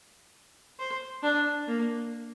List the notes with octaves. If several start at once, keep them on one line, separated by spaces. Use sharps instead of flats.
C5
D4
A#3